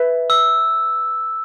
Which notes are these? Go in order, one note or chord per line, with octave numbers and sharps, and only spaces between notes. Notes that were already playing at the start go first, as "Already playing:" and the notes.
Already playing: B4 E5
E6